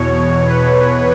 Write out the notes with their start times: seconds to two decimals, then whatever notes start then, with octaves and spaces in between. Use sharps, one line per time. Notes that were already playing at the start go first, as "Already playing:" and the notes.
Already playing: E2 B2 C#5
0.49 B4